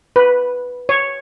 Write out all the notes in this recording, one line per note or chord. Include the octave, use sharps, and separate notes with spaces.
B4
C#5